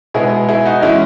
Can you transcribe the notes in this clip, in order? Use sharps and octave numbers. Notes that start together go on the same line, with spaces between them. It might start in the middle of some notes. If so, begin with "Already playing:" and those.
B2 G#3 B3 E4 G#4
E4 G#4
D#4 F#4
E3 G#3 C#4 E4